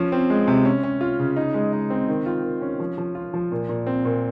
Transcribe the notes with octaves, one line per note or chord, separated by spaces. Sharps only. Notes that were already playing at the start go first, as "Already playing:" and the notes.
Already playing: F3 C#4
C4
G#3
C3
C#4
C#4
F4
C#3
D#4
G#3
D#4
C4
D#3
F4
D#3
C#4
F3
F3
F4
F3
A#2
A#2
C4
A#2